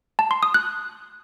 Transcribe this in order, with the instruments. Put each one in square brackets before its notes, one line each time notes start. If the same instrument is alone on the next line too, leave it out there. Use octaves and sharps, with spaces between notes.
[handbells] A5
C6
D#6
F#6